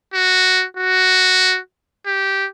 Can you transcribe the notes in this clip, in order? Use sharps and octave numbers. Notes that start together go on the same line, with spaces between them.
F#4
F#4
G4